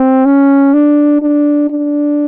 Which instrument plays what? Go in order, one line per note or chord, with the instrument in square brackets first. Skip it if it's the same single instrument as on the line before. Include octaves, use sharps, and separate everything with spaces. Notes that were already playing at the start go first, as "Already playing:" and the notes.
Already playing: [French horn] C4
C#4
D4
D4
D4